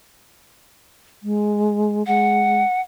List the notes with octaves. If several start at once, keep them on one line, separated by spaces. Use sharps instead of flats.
G#3
G#3 F#5